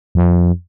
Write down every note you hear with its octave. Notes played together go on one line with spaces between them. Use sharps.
F2